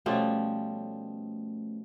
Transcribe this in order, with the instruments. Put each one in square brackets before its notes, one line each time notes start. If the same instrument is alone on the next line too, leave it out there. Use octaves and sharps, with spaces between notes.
[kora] B2 F3 G3 [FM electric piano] A3 C#4